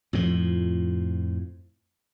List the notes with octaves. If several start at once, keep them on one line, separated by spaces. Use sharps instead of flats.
F2 A2 F3